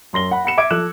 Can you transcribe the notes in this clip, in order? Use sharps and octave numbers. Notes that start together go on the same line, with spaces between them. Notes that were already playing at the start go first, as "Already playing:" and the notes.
F#2 C6 A#6 G7
F#5 B5
F#5 B5 C#7 E7
E5 D6 G#6 D7
F3 A4 E6 F#6 E7